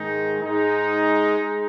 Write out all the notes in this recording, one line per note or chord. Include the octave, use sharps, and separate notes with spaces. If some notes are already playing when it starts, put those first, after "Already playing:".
Already playing: G#2 D#3 G#3 D#4
G#2 G#3 D#4
G#3